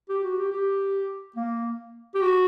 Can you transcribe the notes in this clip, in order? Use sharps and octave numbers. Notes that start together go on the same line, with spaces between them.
G4
F#4
G4
G4
A#3
G4
F#4